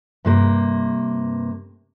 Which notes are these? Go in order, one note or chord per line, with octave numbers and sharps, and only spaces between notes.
G2 C3 A#3